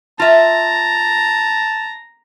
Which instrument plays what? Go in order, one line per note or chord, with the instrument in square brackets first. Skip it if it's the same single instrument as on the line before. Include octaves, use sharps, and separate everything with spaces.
[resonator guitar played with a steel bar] F4 E5 [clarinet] A5 [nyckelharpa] A#5